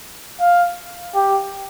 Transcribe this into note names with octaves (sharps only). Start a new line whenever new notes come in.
F5
G4